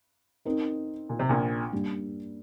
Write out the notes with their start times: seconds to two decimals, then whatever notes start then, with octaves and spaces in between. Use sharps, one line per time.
0.45 C4 D#4 A#4
1.09 A#2
1.19 C3
1.29 A#1 A#2
1.73 G3 A#3 D4